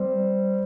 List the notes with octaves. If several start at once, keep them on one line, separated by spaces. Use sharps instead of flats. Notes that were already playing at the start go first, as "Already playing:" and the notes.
Already playing: G3 C4 C5